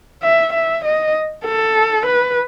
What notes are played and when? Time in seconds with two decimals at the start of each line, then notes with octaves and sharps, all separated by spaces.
0.23 E5
0.53 E5
0.84 D#5
1.45 A4
2.06 B4